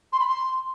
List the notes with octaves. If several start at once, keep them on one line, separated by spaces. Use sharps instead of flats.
C6
B5
C6